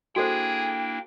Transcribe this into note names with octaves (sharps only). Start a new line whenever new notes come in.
A#3 D4 E4 F#4 G#4 A4 C5 G5